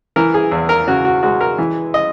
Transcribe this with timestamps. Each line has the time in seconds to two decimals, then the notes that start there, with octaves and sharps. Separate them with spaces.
0.16 E3 A#4
0.34 G#4
0.52 E2
0.69 A#4
0.87 C#3 F#4
1.05 F#4
1.23 G#3 F#4
1.41 A#4
1.58 E3
1.94 D#5